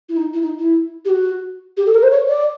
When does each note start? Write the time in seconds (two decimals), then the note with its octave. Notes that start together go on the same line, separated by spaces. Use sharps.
0.09 E4
0.16 D#4
0.33 E4
0.42 D#4
0.59 E4
1.05 G4
1.09 F#4
1.77 G4
1.86 A4
1.94 A#4
2.03 C5
2.11 C#5
2.28 D5